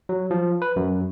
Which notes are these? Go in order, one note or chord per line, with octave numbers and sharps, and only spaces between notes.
F#3
F3
B4
F#2